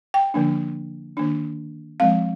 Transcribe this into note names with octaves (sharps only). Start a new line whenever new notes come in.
G5
D3 F3 A#3 D4
D#3 A#3 D4
F3 G#3 C4 F5